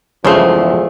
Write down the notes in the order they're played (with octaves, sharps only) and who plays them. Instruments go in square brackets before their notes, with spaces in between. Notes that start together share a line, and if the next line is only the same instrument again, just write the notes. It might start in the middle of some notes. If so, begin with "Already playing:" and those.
[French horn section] E2 F3 [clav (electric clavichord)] G2 C#3 C5 [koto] G#3 A3